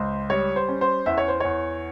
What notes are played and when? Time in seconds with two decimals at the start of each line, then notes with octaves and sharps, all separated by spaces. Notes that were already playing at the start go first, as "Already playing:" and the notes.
Already playing: C#2 C5
0.30 G3 C#5
0.56 C5
0.68 C#4
0.81 C5
1.06 E2 E5
1.18 C#5
1.28 C5
1.40 E2 C#5